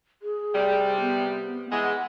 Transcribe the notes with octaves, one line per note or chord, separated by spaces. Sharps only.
G#4
C3 G3
B3
E3 G#3 F#5